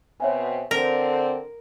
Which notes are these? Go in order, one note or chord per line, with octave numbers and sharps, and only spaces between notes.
B2 C4 C#5 E5 G#5
D3 C4 A#4 F7